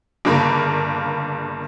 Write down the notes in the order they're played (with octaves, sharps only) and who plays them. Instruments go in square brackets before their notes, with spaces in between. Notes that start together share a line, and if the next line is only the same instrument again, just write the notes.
[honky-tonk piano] G1 G2 C#3 A#3 A#4 B5